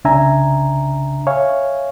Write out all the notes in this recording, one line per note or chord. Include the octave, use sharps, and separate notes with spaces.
C2 C#3 D4 E5 G#5 A#5
C#5 E5 F5 G#5